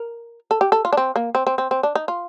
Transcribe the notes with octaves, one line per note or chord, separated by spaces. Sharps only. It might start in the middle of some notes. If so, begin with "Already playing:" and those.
Already playing: A#4
A4
G4
A4
F4
D4
C4
A#3
C4
C4
C4
C4
D4
D#4
F4